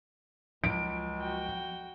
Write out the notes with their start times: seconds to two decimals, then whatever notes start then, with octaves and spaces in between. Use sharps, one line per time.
0.64 C#2 F3 F#3 D7
1.20 F#4 G5